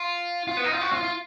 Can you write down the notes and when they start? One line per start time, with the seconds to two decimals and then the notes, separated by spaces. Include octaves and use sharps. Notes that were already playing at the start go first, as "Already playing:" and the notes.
Already playing: F4
0.48 F4
0.57 B3
0.64 D#4
0.73 F4
0.81 F#4
0.92 F4
1.03 F4